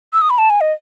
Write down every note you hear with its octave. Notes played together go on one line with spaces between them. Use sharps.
E6
D#6
B5
A5
G#5
D#5